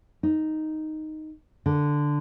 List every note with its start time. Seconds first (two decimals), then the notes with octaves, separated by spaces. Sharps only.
0.23 D#4
1.66 D3